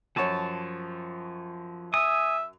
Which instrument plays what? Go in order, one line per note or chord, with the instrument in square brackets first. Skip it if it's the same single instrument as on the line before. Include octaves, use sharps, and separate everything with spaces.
[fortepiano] F#2 C#5 [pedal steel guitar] F3 A5
[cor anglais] E5 [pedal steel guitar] G#5 D#6